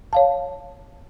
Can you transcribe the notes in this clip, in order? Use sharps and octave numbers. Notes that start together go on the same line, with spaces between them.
C#5 F5 A5